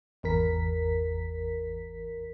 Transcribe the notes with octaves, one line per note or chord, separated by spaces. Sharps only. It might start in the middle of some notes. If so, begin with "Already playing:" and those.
G#1 E2 A#4 B6